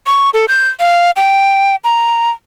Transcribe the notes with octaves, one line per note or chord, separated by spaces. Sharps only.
C#6
A4
G6
F5
G5
A#5